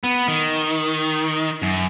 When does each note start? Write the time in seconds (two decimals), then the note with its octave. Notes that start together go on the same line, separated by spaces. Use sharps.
0.04 B3
0.28 D#3
1.62 F#2